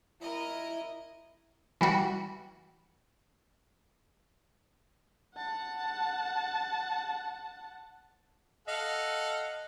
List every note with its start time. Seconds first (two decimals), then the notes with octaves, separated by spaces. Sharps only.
0.21 E4 A#4 D#5
1.81 E3 G3 F#4
5.36 F#5 A5
8.68 A4 D#5 F5 F#5